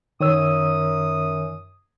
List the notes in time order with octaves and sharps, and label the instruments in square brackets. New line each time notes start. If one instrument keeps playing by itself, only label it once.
[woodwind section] F#2 D#6 [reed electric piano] D#3 C#5 E6